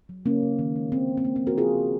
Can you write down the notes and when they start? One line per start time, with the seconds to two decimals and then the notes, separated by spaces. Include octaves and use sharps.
0.09 F#3
0.25 C#3 A#3 C#4
0.43 C#3
0.59 D#3
0.76 G#3
0.92 D#3 C4
1.08 G#3
1.17 C4
1.25 G#3 A#3
1.36 C4
1.42 F3
1.47 F#4 A#4
1.58 C#3 F4 G#4
1.75 C#3